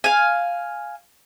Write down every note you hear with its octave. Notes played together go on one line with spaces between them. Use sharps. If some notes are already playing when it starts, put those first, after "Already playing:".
F5 G#5